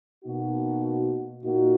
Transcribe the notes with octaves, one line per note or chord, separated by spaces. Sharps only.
B2 A#3 D#4 F#4
A#2 A#3 D#4 F#4